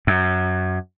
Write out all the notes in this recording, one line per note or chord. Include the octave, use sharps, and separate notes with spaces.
F#2